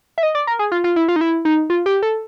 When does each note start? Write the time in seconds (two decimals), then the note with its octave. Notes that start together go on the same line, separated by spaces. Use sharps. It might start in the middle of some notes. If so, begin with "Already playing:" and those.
0.18 E5
0.23 D#5
0.35 D5
0.47 A#4
0.59 G#4
0.72 F4
0.84 F4
0.96 E4
1.08 F4
1.16 D#4
1.21 E4
1.45 D#4
1.70 F4
1.86 G4
2.03 A4